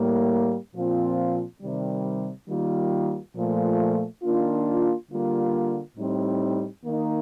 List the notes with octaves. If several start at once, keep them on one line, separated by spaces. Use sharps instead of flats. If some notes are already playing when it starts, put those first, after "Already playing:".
Already playing: A2 G3 A#3
A#2 F3 C4 F4
C3 D#3 G3
D#3 G3 A#3 F4
A#2 F3 A3
D#3 A#3 D4 F4
D3 G3 A#3 F4
A2 G3 C4 D#4
D#3 A#3 D#4